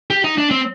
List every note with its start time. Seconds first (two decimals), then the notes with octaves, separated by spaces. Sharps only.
0.10 G4
0.24 D#4
0.38 D4
0.51 C4